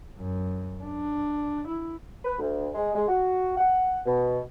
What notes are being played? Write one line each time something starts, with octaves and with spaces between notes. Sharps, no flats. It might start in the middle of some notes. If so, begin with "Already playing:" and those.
F#2
D4
E4
B4
D2
G#3
G#3
F#4
F#5
B2